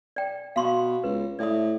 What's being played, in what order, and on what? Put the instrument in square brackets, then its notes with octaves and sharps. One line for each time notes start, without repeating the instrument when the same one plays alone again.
[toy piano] D5 G5
[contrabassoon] B2 [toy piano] F5 C6 C#6
[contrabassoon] C#2 [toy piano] B4
[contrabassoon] A2 [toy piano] D5 E5 D#6